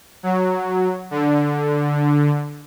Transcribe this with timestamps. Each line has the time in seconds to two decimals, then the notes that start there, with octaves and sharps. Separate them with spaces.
0.23 F#3
1.11 D3